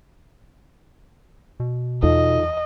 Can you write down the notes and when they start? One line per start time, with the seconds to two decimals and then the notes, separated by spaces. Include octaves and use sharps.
1.60 B2
2.03 E2 D#4 F4 A4 D#5